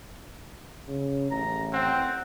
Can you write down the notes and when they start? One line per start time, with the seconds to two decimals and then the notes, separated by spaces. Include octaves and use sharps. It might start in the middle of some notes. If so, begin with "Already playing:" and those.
0.88 C#3
1.31 A1 A#5
1.73 C4 F#5